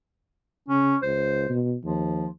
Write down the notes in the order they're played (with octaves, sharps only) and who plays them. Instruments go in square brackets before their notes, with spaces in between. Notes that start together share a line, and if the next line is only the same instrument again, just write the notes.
[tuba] C#3 [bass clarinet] C#4
[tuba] C#2 [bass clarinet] C5
[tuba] B2
[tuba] D#2 [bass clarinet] F3